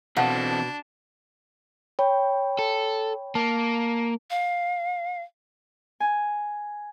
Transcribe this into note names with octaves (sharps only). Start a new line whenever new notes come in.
B2 E3 C4 D4 A4 F5 F#5 A5
C#5 G5 B5
A4
A#3 A5
F5
G#5